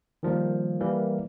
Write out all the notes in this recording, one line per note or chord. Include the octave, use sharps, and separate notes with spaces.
D#3 F3 G3 A#3
E3 G3 A#3 A#4